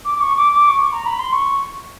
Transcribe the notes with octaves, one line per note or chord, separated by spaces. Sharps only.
D6
D6
C#6
D6
D6
C#6
A#5
B5
C6
C#6